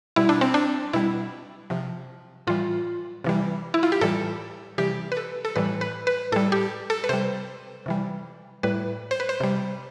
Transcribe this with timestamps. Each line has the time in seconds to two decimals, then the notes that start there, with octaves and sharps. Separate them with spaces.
0.16 B2 G3 E4
0.29 D4
0.41 C4
0.54 D4
0.93 B2 G3 E4
1.70 C3 F3
2.47 A2 E3 G3 F4
3.24 C3 E3 G3
3.74 E4
3.83 F4
3.92 G4
4.01 A2 E3 G3 A4
4.78 C3 E3 G3 G4
5.12 B4
5.17 A4
5.45 A4
5.56 A2 E3 G3 B4
5.81 B4
6.07 B4
6.32 A2 G3 A4
6.52 G4
6.90 A4
7.04 B4
7.09 C3 G3 C5
7.86 C3 E3 G3
8.63 A2 G3 B4
9.11 C5
9.20 B4
9.29 C5
9.40 C3 G3